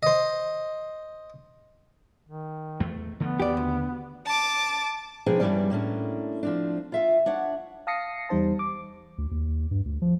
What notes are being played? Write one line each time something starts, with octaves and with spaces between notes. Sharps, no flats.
C5 D#5
D#3
E2 A3
D3 F3 A3 B3
D#2 G4 D5
D2
A5 D6
B2 F3 D4 D#4 G#4 G5
G2 D3 E3 G3 C#4 D5
A2 A#3 C#4 D4
F3 C4 D4
F4 E5 F5
D4 C#5 F#5
F5 A5 D#6 A#6 C7 C#7
E2 G3 D#4 C5 A5
D6
D2
D#2
G2
D2
F3